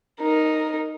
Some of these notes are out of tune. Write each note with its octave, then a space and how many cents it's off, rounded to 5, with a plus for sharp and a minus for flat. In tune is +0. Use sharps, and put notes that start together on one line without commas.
D#4 +0 A#4 +0